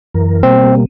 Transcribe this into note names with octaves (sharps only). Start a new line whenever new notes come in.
F#2 E3 A#4
B2 G3 A#3 C4